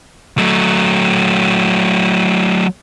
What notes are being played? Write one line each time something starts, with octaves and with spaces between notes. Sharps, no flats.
F#3 A3